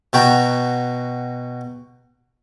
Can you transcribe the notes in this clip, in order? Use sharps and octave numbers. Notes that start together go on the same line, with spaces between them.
B2 F#4 G5 A#5